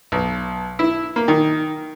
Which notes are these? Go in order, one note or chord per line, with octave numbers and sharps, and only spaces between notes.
B1
E4
A#3
D#3